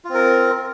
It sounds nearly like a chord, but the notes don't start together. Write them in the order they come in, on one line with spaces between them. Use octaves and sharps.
F4 C4 A#4